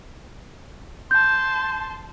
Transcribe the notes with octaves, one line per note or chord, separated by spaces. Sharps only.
A5 C6 G6